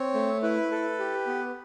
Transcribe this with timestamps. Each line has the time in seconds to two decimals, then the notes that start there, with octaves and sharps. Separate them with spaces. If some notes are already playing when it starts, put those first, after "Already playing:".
Already playing: C4 C#5
0.14 A3
0.43 E4 B4
0.71 A4
0.99 G4
1.27 B3